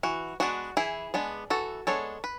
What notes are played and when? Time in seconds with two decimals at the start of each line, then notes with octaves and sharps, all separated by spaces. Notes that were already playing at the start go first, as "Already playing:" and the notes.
0.03 E3 F#4
0.40 G#3 B3 D4 F#4
0.77 E3 E4 G#4
1.14 G#3 B3 D4
1.50 E3 F#4 A4
1.87 G#3 B3 D4 A4 C#5
2.24 B4